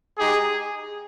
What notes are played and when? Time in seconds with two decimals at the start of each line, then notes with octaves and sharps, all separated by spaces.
0.18 G#3 D#4 G4 G#4